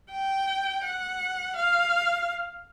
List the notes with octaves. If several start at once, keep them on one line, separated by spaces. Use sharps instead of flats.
G5
F#5
F5